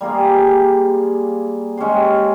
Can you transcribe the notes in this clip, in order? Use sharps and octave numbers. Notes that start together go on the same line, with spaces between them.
G3 A#3 F4 G#4
G#3 C#4 G4 C5